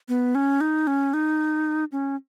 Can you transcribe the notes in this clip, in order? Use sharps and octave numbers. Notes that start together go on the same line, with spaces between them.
B3
C#4
D#4
C#4
D#4
C#4